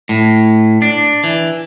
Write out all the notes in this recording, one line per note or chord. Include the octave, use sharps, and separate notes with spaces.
A2
D4
E3